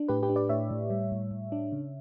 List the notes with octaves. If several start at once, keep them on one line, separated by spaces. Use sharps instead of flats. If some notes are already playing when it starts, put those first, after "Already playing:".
Already playing: D4
A2 G4 B4
G4 B4
D4
B4 D5
A2 C#5 E5
A2
G3
A2
A2
D4
C#3